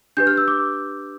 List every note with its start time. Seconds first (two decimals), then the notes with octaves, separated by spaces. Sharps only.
0.17 D4 G4 B4 G6
0.27 F6
0.37 E6
0.48 D6